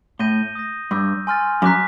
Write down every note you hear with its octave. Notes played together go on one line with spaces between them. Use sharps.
A2 G6 A#6 D#7 G7
D#6 G6 A#6
G2 C#6 E6 G6
G#5 C6 F6 A6
F#2 A#5 D6 F#6 B6